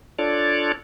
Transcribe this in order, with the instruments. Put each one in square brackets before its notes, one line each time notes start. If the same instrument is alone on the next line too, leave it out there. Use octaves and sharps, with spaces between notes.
[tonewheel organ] D4 F4 A4 C#5 D5